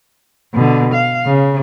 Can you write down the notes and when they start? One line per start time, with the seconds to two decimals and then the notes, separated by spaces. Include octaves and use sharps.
0.54 B2 D3
0.94 F5
1.26 C#3